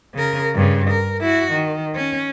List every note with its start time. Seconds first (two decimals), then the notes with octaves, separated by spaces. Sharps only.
0.14 C#3 A#4
0.55 G2 C#3
0.91 A#4
1.21 E4 F#4
1.53 D#3
1.95 C#4